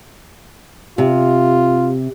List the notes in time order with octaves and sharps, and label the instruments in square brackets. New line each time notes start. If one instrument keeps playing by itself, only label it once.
[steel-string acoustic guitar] C3 [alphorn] F4